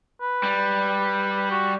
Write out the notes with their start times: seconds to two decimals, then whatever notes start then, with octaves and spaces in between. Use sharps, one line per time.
0.21 B4
0.43 G3
1.51 F#4